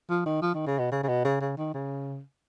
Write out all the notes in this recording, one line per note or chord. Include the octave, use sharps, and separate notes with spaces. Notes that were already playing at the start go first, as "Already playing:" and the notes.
F3
D#3
F3
D#3
C#3
B2
C#3
C#3
B2
C#3
C#3
D#3
C#3